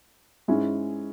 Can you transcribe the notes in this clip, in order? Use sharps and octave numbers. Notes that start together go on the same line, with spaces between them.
G#2 G#3 C#4 E4